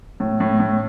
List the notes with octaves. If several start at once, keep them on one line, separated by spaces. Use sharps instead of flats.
A2
A2
A2